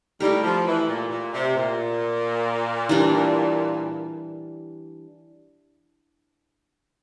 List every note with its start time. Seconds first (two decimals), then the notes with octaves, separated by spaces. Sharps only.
0.20 G3 A3 E4 G4 A#4
0.43 F3
0.66 E3
0.88 A#2
1.10 A#2
1.33 C3
1.56 A#2
2.89 E3 G3 D4